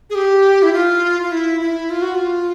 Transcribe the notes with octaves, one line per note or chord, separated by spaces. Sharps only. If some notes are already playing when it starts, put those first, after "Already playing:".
G#4
G4
E4
F4
F4
E4
E4
F4
F#4
F4